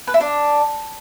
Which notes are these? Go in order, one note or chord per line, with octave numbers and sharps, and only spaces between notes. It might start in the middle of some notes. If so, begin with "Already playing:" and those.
B4
E4
D4